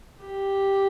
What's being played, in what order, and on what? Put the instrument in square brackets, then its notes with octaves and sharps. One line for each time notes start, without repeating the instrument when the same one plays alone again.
[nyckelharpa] G4